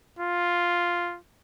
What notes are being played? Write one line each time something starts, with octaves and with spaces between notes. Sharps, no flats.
F4